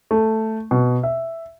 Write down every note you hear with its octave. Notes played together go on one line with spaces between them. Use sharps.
A3
B2
E5